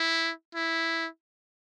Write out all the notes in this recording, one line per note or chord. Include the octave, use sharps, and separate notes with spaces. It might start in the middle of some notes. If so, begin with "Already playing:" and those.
Already playing: E4
E4